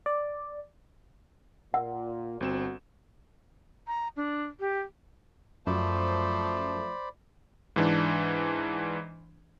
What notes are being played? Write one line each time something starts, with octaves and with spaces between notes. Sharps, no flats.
D5
A#2 F#5
G1 C4 F#4 E7
A#5
D4
G4
F#2 F3 A3 C5 D5 B5
G#2 E3 D4